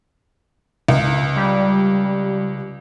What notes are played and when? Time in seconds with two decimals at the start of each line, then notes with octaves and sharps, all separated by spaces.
0.88 C#2
1.36 G3